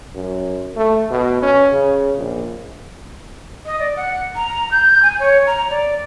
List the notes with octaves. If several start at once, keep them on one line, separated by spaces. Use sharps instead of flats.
F#2
A3
B2
C#4
C#3
A#1
D#5
D5
F#5
A#5
G6
G#5
C#5
A#5
D5